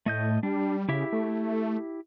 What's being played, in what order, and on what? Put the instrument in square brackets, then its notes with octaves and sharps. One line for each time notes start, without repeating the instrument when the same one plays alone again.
[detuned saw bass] A2 [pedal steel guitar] A3 D#5 G6
[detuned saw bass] G3 [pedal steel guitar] D4
[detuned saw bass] C#3 [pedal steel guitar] E4 G4 E5
[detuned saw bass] A3